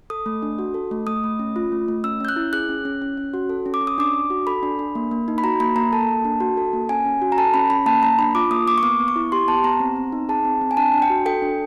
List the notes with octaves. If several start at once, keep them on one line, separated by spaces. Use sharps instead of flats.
A4 D#6
A3
D4
F#4
A4
A3
A3 D#6
A3
C#4
F4
A3
A3
C#4 E6
C#4 G6
F#6
E4
G#4 F#6
C#4
C#4
C#4
C#4
F#4
A4
C#4
D6
C#4
D#6
D4 D6
D4
F#4
A4 B5
D4
D4
A#3
A#3
D#4
B5
F#4 A#5
A#3 B5
A#3 A#5
A4 A5
A#3
D4
F#4
A4
A#3
C#4 G#5
C#4
F#4
A#5
A4 A5
C#4 B5
C#4 B5
A#3 A5
A#3 A#5
D4 B5
F4 D6
A#3 D#6
A#3 D6
C#6
B3 D6
B3
C#6
E4
G4 C6
B3 A5
B3 A#5
C4
C4
D#4
G#4 A5
C4
C4
G#5
D4 A5
D4
G5
F#4
A4 G5
D4